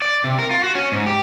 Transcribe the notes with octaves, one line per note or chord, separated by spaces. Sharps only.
D5
C3
A#4
F4
F#4
C#4
G#2
G4